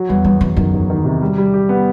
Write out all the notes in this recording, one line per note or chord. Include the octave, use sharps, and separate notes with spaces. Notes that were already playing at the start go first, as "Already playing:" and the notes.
Already playing: F#3
E2 G3
E2 G3
E2 E3
F#2 D#3
D#3
D#3
C3
G3
G3
G4
B3